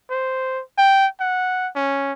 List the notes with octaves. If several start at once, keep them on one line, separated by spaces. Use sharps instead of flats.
C5
G5
F#5
C#4